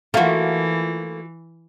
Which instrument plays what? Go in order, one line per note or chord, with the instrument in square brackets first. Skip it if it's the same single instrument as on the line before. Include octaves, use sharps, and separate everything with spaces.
[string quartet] E3 [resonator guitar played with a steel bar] A3 A#3 [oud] F4 F#4